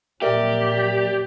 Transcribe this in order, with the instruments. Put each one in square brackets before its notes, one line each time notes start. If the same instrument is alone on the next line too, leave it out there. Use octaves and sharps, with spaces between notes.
[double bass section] F2 A#2 F#3 [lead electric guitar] G4 [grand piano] A#4 E5 [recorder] D5